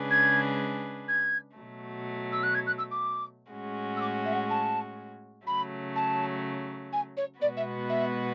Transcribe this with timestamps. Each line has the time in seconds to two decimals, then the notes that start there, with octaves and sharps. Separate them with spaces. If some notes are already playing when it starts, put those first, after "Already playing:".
Already playing: C#3 G#3 D4 G#4 B4
0.10 G#6
1.08 G#6
1.56 B2 F#3 A3
2.32 E6
2.43 F#6
2.54 G#6
2.66 F#6
2.78 E6
2.91 D6
3.51 A2 G#3 C#4 F#4
3.96 E6
4.01 D6
4.25 E5
4.33 F#5
4.49 A5
5.46 C#3 F#3 A3 B5
5.95 A5
6.92 G#5
7.17 C#5
7.41 B2 G#3 B3 F#4 B4 D5
7.57 E5
7.89 E5